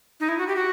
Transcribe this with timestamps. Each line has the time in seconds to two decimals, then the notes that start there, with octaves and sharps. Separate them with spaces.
0.20 D#4
0.29 E4
0.38 F#4
0.47 G4
0.56 F#4